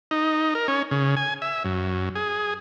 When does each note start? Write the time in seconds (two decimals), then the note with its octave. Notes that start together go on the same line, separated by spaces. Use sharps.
0.11 D#4
0.55 A#4
0.68 C#4
0.91 C#3
1.17 G#5
1.42 E5
1.65 F#2
2.16 G#4